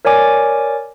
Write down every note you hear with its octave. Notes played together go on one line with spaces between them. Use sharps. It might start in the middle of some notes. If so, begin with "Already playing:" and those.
A#4 C#5 D5 G#5 D6